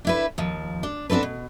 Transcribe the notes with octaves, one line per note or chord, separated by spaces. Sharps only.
D4 E4 B4
D#2 F3
D4
B3 C4 D4 A4 B4
B2